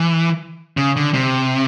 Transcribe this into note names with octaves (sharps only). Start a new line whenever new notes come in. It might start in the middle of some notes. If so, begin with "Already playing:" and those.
Already playing: E3
C#3
D3
C3